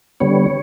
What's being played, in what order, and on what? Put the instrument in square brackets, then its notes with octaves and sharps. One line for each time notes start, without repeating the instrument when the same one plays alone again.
[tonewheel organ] D3 G3 B3 C#5